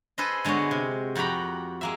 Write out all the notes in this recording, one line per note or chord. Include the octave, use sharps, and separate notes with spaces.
G#4 A4 B4 C5 D#5
D3 G#3 B3 F#4 C#5
C3
F2 F#4 G4 A#5 B5
G#3 A#3 E5